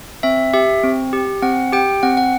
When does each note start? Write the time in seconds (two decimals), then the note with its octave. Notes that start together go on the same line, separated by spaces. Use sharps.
0.23 C4 E5
0.54 G4 E5
0.83 C4
1.13 G4
1.42 C4 F#5
1.73 G4 G5
2.03 C4 F#5
2.17 F#5